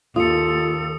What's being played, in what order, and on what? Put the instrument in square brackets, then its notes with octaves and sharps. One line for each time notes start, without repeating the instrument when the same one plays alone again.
[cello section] D#2 [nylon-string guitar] F4 [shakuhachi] A4 [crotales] D#6 C#7